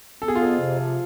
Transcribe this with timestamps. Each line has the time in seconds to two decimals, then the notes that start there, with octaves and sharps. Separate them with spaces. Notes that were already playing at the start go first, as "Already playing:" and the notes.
0.21 B3 A4
0.28 G#4
0.35 F4
0.41 F2 G#4
0.60 C3
0.79 F3